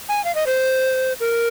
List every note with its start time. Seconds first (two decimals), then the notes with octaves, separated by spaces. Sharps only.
0.09 G#5
0.25 F5
0.35 D#5
0.46 C5
1.20 A#4